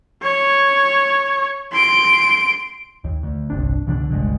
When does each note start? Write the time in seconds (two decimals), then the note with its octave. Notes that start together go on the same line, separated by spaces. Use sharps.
0.22 C#5
1.72 C6 D7
3.04 D#2
3.23 D2
3.50 G1 C2 D4
3.87 C#2 B2 D3 D4
4.09 G1 C#2 G2 G#3